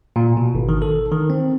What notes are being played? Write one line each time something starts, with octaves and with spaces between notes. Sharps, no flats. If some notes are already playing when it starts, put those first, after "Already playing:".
A#2
B2
G#1
D#3
A4
D#3
C4